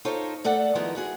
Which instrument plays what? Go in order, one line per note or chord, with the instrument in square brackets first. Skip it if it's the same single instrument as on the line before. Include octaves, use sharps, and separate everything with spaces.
[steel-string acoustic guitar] D#4 F4 A4 C5 C#5
A3 A4 D5 F#5
D#3 F3 G#3 B3 D#4 E4
E4 F#4 G#4